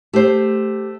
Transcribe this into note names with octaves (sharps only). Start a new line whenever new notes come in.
A3 G4 C5